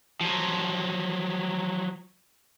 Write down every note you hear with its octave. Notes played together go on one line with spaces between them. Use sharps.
F3 F#3